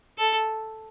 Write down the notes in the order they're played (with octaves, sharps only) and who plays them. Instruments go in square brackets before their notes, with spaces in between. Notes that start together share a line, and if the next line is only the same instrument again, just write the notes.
[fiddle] A4